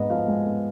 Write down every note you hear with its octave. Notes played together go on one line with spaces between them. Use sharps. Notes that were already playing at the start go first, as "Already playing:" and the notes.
Already playing: G#2 B3 D#5
F3 F5
G#3
B3